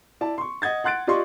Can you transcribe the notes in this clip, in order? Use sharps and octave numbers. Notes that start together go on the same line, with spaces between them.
E4 D5 A5
C6 C#6
D#5 F#5 G#6 A6
F#5 C6 F#6 A6 D7
F4 G4 D5 D#5 C6 C#6